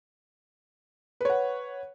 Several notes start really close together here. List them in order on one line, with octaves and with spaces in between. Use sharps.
B4 C#5 F#5